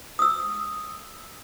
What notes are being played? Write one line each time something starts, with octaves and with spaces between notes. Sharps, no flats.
D#6 E6